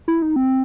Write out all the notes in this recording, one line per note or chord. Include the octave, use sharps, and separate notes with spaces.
E4
D#4
C4